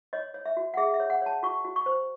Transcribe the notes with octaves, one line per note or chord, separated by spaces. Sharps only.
C#5 D#5
C#5
E5
F#4
F#5
G#4 E5
E5
C#5
F#5
C#5 A5
F#4 C#6
F#4
C#6
C5